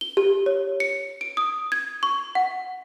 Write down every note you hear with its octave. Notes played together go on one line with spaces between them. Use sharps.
G7
G4
C#5
C#7
D7
D#6
G#6
C#6
F#5